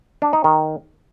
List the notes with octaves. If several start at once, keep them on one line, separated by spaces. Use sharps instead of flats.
D4
D#4
D#3